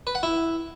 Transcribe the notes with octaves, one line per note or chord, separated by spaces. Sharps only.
B4
F#5
E4